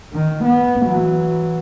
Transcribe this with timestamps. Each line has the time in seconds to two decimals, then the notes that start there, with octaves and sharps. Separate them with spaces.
0.13 D#3
0.44 B3
0.83 E3 F#3